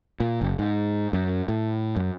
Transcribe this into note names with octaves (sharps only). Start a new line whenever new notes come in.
A#2
F#1
G#2
F#2
A2
F#2